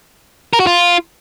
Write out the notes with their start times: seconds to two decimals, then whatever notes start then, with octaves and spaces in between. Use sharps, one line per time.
0.53 A#4
0.60 F#4
0.67 F4